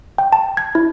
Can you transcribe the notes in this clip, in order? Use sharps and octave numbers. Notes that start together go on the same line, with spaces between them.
G5
A5
G#6
E4